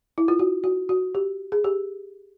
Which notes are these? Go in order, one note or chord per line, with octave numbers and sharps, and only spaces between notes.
E4
F4
F#4
F#4
F#4
G4
G#4
G4